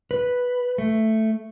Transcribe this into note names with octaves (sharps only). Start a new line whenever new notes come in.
B4
A3